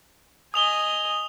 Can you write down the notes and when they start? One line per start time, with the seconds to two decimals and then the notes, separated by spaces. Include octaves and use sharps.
0.54 D#5 G#5 D#6 F7 G7